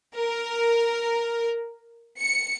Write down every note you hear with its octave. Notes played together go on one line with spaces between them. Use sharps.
A#4
C#7